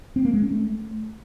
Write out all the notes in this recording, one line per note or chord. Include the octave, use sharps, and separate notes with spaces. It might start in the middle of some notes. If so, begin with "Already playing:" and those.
C4
A#3
G#3
C#4
A3